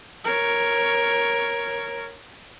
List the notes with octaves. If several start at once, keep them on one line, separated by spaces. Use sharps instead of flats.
A#4 C#5